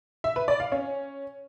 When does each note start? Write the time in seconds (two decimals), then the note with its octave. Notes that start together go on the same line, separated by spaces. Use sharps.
0.24 E5
0.36 B4
0.48 D5
0.60 F5
0.72 C#4